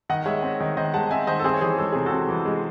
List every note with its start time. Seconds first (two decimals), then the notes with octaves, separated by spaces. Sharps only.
0.09 D#3 D#5 F#5
0.26 G#3 C#5 E5
0.43 C4
0.60 D#3
0.77 D#3 C5 D#5
0.94 G#3 F#5 A5
1.11 C4 E5 G#5
1.27 D#3 C5 D#5
1.40 A4
1.44 C4 G#4 C5
1.54 C#5
1.61 E3 G#4 C5
1.78 G#3 A4
1.93 C3 G#4
2.06 F#4 A4
2.12 C4
2.29 E3
2.46 G#3